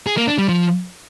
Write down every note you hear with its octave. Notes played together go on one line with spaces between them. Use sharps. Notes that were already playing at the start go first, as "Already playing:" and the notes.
G#4
A#3
D4
G3
F3